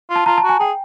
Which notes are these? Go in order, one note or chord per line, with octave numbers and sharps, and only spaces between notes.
F4
A5
F4 A#5
A5
F#4
G#5
G#4 G5